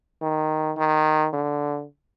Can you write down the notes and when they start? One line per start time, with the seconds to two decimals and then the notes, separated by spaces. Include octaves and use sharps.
0.22 D#3
0.77 D#3
1.33 D3